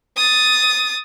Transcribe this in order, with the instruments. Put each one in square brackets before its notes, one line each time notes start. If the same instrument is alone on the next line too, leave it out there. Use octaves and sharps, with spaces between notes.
[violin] D#6 A6